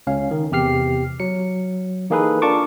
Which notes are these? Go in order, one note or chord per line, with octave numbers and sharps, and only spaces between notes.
C#2 C#4 F5
D#3
E2 C3 G4 F6 C7
F#3 C#7
E3 A#3 D#4 G#4 A4 B4
D4 F4 A#4 A5 C#6 D6